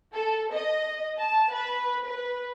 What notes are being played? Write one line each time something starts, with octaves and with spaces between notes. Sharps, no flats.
A4
D#5
A5
B4
B4